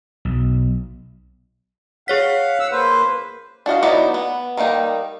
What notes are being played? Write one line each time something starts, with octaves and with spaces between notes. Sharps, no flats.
B1
G#4 C#5 F5 F#5 B6
F#5 E6
A#3 B4 C5
D4 F#4 D#5 F5
F#3 B3 D#4 E4 D5
B3
D#3 G3 A#3 D#4